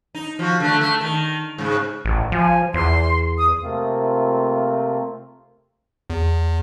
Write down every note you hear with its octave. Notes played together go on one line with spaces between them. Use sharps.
D#4
F3 F#4
D3 A3
A3
D#3
G#2 C#3
A1
F3 G#5
E2 C6
D#6
C3 A3 A#3 C4 F4
E2